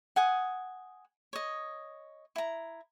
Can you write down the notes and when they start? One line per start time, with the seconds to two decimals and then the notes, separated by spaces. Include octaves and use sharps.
0.16 F#5 G#5 D#6
1.33 C#5 D#5
2.36 E4 A#5